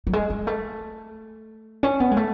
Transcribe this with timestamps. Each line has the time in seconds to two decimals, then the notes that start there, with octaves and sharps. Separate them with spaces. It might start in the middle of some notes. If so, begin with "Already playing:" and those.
0.07 F#3
0.13 G#3
0.30 G#3
0.47 A3
1.83 C#4
2.00 B3
2.11 G#3
2.17 A3